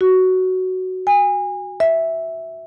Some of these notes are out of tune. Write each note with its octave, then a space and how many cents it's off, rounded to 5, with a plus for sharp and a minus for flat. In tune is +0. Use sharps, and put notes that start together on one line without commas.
F#4 +10
G#5 -30
E5 -5